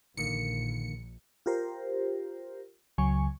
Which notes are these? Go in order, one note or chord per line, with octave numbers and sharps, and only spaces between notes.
A#1 D3 D#3 A#3 C#7
F4 G4 A#4 C5
C#2 C#3 F#3 G#5 C#6